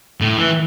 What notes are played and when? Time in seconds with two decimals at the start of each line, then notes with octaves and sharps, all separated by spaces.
0.21 A2
0.37 E3